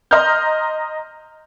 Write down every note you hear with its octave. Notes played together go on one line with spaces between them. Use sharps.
D#5 A#5 C6 F6 G6